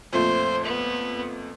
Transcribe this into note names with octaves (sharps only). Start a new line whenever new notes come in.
F2 A#2 A3 C5
B3